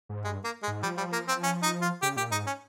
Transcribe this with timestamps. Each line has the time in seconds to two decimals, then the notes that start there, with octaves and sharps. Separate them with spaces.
0.09 G#2
0.24 G2 G#3
0.44 A#3
0.63 G#3
0.68 G#2
0.83 F3 G3
0.97 G3
1.12 A#3
1.28 C4
1.43 C#4
1.63 D#4
1.81 F4
2.02 C#3 G4
2.16 A#2 G4
2.31 G#2 D#4
2.46 C#4